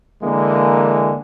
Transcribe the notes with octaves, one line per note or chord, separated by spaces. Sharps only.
D3 E3 G#3 A#3